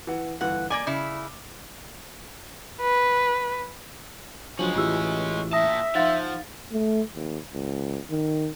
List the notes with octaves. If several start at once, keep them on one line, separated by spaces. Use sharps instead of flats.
E3 F#5
G1 E3 F#5
A#3 D5 G#5 D6
C#3 E4
B4
F3 F#3 G#3 C#4 D4 F#7
A1 E3 F4 G4 E6
A#2 E5 A5 D#6 A#6
F3 D#4 F5 F#5 C6 A6
A3
D#2
C#2
D#3